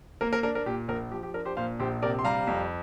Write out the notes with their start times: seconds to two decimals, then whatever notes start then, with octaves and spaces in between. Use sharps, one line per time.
0.21 A#3 A#4
0.33 A#4
0.43 D4 A#4
0.55 A#4
0.66 A#2 G4
0.89 A#1 A#4
1.12 F3 G4
1.23 G4
1.34 D4 A#4
1.45 G4 C5
1.57 A#2 C5 F5
1.79 A#1 G4 C5
2.02 C3 A#4 D5
2.19 C6
2.24 G3 F5 A#5
2.47 F2